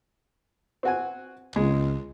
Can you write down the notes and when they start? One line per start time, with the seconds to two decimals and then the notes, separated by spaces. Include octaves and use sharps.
0.83 C4 F#4 G#5
1.56 C#2 G#3